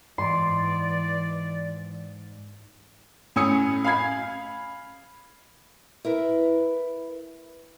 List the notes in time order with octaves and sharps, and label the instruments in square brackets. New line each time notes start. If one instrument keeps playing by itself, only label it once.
[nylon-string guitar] G#2 [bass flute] E3 [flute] D5 [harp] C6
[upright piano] A2 C#4 G#5 D#6 E6 C#7
F5 G#5 B5 G#6 C7
[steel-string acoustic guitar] E4 A#4 B4 E5